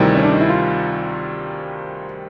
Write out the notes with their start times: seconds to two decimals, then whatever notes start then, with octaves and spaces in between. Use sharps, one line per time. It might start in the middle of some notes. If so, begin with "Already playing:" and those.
Already playing: D2 C3 D#3 G3 C4 E4
0.15 C#4
0.23 D4
0.32 D#4
0.41 E4
0.49 F4